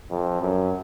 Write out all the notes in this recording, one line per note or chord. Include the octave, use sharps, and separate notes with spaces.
F2
F#2